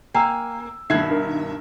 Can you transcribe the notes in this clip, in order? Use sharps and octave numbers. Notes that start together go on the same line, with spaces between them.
A#3 G5 G#5 E6
G2 B2 D#3 E5 F#6 G#6 C7
A#4